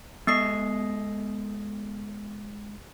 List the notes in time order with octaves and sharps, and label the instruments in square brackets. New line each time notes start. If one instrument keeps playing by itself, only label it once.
[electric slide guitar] G#3 A4 D#5 [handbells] B3 D#6 C7